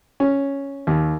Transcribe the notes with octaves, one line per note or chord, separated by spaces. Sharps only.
C#4
D#2